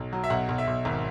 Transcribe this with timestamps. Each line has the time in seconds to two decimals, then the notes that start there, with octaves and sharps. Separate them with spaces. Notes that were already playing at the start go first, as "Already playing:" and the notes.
Already playing: B1
0.13 F#3
0.24 E5
0.30 B1 F#5
0.49 B1
0.58 E5
0.67 B1
0.85 G#1